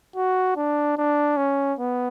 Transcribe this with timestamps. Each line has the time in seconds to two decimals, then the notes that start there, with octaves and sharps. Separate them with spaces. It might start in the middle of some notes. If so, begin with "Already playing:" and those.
0.16 F#4
0.57 D4
0.98 D4
1.37 C#4
1.79 B3